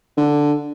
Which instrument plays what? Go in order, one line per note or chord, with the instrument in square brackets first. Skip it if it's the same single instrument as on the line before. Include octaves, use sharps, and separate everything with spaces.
[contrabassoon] D3